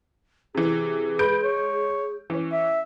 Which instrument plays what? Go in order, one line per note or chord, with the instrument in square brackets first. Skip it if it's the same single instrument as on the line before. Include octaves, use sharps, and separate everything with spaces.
[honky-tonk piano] C3 E3 [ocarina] G#4
[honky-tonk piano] G#3 G6 D7 [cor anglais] B4
[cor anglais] C#5
[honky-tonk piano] E3 C#4
[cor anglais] E5